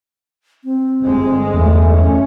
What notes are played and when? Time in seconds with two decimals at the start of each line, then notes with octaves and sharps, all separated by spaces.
0.64 C4
1.03 G1 G#3
1.53 E2 A3
1.94 C#4